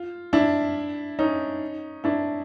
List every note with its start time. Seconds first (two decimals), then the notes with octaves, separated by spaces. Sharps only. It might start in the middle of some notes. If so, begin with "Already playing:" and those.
Already playing: F4
0.33 D4 E4
1.19 C#4 D#4
2.04 D4 E4